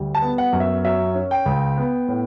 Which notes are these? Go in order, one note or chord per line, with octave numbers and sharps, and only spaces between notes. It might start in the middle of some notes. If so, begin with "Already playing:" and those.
Already playing: D2 G3
A5
B3
F#5
F#2
E5
F#3 E5
C#4
G5
C#2
B3
A2